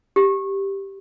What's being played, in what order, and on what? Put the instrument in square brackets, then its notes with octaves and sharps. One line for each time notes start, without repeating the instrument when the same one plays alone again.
[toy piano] G4